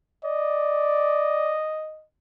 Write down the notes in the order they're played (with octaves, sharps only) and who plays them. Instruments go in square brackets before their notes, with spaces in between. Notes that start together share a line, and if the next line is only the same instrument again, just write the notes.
[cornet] D5 [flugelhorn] D#5